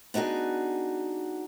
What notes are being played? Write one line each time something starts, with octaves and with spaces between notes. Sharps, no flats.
B3 D4 D#4 F#4 G#4